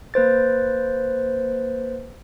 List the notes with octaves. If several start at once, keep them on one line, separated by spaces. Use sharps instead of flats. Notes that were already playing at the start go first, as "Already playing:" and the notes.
A#3 B4 C5 A6